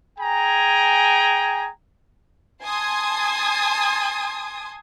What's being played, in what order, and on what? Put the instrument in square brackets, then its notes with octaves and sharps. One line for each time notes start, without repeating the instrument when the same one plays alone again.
[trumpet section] G#4 G5 G#5 A#5
[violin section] G#5 A5 C6 D#6 G#6